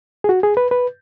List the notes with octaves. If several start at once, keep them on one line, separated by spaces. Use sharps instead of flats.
G#4
F#4
G#4
B4
B4